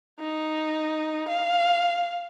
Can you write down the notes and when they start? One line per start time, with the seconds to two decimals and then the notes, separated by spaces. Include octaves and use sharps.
0.20 D#4
1.28 F5